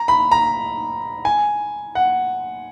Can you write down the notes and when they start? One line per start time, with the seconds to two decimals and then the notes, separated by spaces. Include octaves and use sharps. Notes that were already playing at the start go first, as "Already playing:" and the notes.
Already playing: A#5
0.08 B5
0.32 A#5
1.25 G#5
1.95 F#5